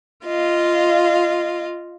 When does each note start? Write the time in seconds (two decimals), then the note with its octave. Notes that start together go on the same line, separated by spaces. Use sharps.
0.25 F4 D#5 F5